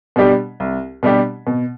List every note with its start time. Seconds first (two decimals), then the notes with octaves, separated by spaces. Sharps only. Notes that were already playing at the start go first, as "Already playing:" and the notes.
0.16 B2 G3 D4 G4
0.60 C2
1.03 B2 G3 D4 G4
1.47 B2